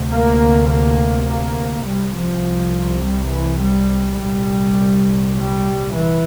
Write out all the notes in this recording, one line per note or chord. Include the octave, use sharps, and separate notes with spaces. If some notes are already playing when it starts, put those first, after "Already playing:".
Already playing: D2 C3
A#3
A#3
A#3
C2 C3 G3
F3
G3
E3
G3
C2 A#2 G3
G3
E3